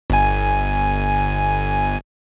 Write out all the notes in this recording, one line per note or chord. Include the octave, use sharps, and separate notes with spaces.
G1 G#5